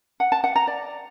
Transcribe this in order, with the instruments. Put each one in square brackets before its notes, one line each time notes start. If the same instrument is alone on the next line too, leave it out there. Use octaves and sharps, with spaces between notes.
[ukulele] F#5
A5
F#5
A#5
D5